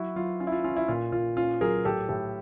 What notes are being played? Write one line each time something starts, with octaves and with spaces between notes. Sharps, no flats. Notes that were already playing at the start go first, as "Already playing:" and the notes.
Already playing: F#3 E4 F#4
F#3 F4
C#4 F4
E4
F4
C#4 F4
E4
A#2 F4
A#2 F4
C#4 F4
F#3 G#4 A#4
A2 G4 A4
A2 G4 A4